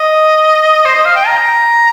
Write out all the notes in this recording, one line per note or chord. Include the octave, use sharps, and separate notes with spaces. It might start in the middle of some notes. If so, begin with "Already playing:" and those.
Already playing: D#5
C5
D#5
F5
G5
A#5